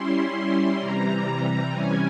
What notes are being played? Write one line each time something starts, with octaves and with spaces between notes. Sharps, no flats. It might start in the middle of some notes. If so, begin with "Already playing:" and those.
Already playing: G3 C#4 E4 C6
C3 E3 G3 A#5
C3 E3 G3 C#4 G#5